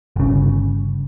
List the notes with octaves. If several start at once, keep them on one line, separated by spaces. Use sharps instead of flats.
G1 C#3